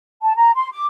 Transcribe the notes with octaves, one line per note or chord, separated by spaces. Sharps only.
A5
A#5
C6
D6